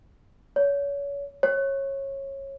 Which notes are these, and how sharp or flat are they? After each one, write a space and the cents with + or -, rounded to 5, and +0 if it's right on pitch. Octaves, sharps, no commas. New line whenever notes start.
C#5 +30
C#5 -20